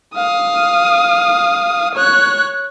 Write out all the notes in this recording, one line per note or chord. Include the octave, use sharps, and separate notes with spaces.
F5 D#6
C#5 F#6